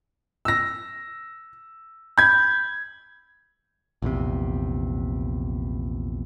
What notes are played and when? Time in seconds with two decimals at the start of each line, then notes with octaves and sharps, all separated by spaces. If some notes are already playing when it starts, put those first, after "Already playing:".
0.45 E6 A#6
2.18 B5 G6 G#6
4.02 A#1 E2 C3